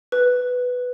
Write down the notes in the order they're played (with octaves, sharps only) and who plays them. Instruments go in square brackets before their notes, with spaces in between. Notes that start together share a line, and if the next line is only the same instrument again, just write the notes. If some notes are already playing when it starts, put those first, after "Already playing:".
[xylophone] B4